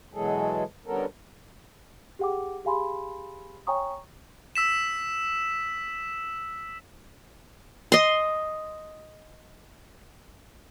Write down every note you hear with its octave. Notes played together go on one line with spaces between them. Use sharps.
B2 E3 F#3 G#3 G#4 A4
D3 G3 B3 C#4 A4 A#4
G4 G#4 F#5 G5 D6
G4 G#4 F5 G#5 B5 C6
C#5 G5 G#5 A#5 C#6 D#6
E6 B6 E7
D#5 C6